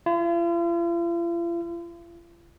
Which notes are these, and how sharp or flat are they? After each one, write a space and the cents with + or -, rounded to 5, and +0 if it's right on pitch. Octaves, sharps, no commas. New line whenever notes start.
F4 -45